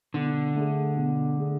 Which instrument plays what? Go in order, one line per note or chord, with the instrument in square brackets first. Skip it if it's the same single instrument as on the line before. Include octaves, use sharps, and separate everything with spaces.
[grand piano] B2 [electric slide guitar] D3
[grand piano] A3 D4 G#4
B2
A3 D4 G#4